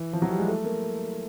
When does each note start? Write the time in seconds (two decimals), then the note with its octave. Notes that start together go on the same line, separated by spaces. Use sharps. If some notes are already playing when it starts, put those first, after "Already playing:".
Already playing: E3
0.13 F3
0.22 F#3
0.30 G3
0.39 G#3
0.48 A3
0.64 A#3